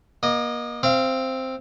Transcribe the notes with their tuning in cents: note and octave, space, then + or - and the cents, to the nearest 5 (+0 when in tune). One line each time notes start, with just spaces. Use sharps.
A#3 +35 D#5 -10
C4 +0 F5 -30